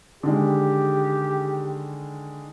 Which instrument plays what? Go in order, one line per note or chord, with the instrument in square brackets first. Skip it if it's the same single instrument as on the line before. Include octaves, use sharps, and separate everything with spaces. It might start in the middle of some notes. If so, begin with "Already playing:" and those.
[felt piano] D3 D#3 G#3 [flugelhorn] G4